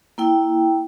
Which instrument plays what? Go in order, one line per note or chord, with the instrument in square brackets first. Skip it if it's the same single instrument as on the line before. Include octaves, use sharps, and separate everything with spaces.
[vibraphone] A#3 E4 G5